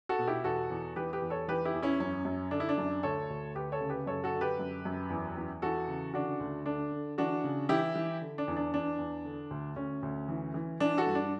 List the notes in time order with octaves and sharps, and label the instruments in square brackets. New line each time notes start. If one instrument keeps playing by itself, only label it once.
[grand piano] F#4 A4
B2
E4 G4
E2 F#4 A4
E2
E3 G4 B4
G4 B4
E2
A4 C#5
E3 G4 B4
E4 G4
E2
C#4 E4
F#2 C#4
F#2
D3 D4
E4
D4
F#2
D2 A4 C#5
D2
D2 G4 B4
A4 C#5
C#3
G4 B4
F#2 A4 C#5
F#4 A4
D3
G4 B4
F#2
F#2
E2
E2
E3 F#4 A4
C#3
D3 D4 F#4
D2
D3 D4
D3
E3 D4 F#4
C#3
E3 E4 G4
E3
D3
D4
E2
D4
E2 D4
E2
D3
D2
D2 C#4
D2
E3
E3
E3 D4
F#4 A4
G2
D4